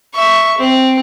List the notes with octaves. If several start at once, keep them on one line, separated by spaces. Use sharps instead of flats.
E5 C#6
C4